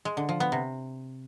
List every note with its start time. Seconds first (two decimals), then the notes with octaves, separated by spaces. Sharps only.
0.05 G#3
0.17 D3
0.29 F3
0.40 B3
0.52 C3